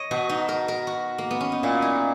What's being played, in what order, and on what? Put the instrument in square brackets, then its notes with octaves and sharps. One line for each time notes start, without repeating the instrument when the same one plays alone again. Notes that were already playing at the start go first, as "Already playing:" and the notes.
Already playing: [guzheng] C#5 D#5
[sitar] B2 [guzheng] F#4
[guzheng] D#4
A#4
A#4
F#4
A#3
B3
C#4
D#4
[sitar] A#2 [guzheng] E4
[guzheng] D#4